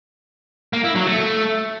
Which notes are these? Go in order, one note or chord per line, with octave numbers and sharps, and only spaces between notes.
A#3
E4
F#3
A3